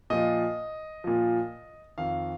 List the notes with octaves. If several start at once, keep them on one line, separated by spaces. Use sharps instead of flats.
A#2 F3 D#5
A#2 F3
F2 D#3 F5